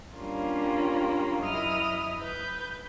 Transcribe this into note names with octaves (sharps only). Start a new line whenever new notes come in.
G3 A#3 C#4 D4 F4
F#2 E4 D#5 D#6 F6
B4 G6